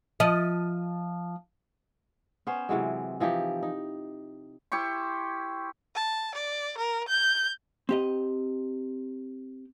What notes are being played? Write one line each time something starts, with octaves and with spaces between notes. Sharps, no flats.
F3 D#5
B3 C#4 C5
C3 E3 F#3 G#3
E3 F3 D#4 G4
D#4
E4 G4 C5 C#6
A5
D5
A#4
G6
C4 G4 D#5